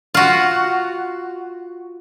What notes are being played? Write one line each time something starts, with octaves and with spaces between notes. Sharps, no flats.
F4 F#4